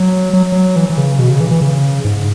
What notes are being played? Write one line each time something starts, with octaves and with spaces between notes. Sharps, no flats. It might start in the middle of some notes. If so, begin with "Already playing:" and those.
Already playing: F#3
F#3
F#3
E3
E3
C#3
B2
C#3
E3
E3
C#3
G#2